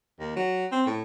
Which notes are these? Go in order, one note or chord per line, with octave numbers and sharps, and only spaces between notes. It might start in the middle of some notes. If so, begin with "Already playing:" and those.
D#2
F#3
C4
A2